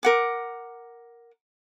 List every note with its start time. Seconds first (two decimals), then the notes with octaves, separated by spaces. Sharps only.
0.03 A#4 F#5 D6